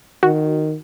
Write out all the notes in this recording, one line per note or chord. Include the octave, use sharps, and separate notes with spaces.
D#3 F#4